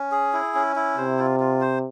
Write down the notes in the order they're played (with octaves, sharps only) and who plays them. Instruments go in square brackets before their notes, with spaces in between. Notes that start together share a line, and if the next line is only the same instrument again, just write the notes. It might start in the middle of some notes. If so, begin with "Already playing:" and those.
Already playing: [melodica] C#4
G#4
E4
C#4
E4
[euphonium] C3 [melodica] C5
[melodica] F4
F4
C5